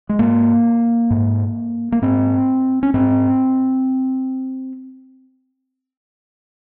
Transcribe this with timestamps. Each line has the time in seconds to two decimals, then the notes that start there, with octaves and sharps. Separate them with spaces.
0.09 G#3
0.19 G#2 A#3
1.10 G#2
1.92 A#3
2.02 G#2 C4
2.83 C#4
2.94 G#2 C4